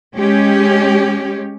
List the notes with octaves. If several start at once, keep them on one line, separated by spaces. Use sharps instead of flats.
G#3 C#4 G4